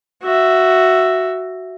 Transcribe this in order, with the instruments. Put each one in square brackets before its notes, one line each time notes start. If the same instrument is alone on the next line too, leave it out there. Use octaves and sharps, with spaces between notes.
[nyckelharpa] F#4 E5